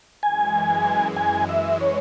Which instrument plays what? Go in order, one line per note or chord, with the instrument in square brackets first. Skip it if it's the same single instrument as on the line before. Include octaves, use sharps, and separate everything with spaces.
[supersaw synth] F#2 E3 G#3 [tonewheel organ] G#5
[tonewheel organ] G#5
E5
C#5